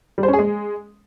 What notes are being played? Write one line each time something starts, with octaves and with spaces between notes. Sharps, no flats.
G3
C5
C#4
G#4
G#3